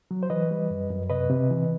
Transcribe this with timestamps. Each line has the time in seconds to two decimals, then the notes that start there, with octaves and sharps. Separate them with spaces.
0.11 F#3
0.23 C5
0.30 E3 B4 D#5
0.51 G3
0.71 F#2
0.90 F#2
1.10 C3 B4 D#5
1.30 C3
1.50 E3